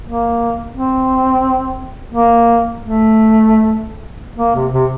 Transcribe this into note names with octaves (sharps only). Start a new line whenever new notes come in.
A#3
C4
A#3
A3
A#3
C3
C3